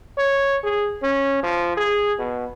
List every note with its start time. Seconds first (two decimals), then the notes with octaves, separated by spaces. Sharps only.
0.18 C#5
0.63 G#4
1.03 C#4
1.43 F3
1.77 G#4
2.19 B2